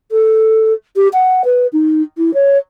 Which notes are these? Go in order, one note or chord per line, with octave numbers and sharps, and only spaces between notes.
A4
G4
F#5
B4
D#4
E4
C#5